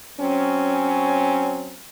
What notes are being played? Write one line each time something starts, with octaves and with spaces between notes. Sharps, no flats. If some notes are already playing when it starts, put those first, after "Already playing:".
F#3 C4 C#4